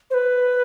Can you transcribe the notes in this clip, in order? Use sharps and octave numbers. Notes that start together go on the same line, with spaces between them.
C5
B4